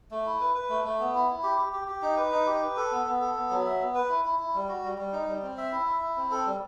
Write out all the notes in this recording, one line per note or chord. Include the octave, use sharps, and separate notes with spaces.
A3
E4
B4
B4
A3
A3
B3
E4
E4
G4
G4
G4
G4
D#4
B4
D#4
G4
B4
A4
B3
B3
A4
B3
F#3
E5
B3
B4
E4
E4
E4
G3
F#4
G3
G3
D#4
G3
C4
E5
E4
E5
E4
C4
A4
G3